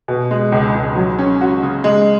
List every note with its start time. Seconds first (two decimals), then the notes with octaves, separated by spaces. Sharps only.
0.08 B2
0.31 G#3
0.52 C#2
0.75 C#2
0.96 F#3
1.18 C#4
1.41 F#4
1.63 C#3
1.84 G#3